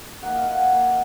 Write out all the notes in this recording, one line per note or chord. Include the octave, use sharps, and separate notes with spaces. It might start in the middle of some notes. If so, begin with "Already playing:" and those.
A#3 D#4 F#5
F5
F#5
G#5
A#3 D#4 G#5